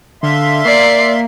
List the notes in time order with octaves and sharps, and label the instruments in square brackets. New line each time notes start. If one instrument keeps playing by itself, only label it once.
[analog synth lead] D3 [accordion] E5 F5 C6
[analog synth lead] A#3 [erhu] D5 [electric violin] C7